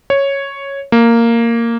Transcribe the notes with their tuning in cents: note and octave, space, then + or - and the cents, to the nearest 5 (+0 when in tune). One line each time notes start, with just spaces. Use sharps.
C#5 -5
A#3 -10